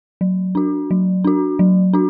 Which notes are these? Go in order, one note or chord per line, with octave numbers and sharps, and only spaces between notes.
F#3
D4 F#4
F#3
D4 F#4
F#3
D4 F#4